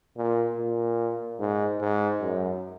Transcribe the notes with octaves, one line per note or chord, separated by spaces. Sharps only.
A#2
A#2
G#2
G#2
F#2